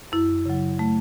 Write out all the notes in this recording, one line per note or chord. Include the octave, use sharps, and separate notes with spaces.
F#2 E4
C#3 F#3
A3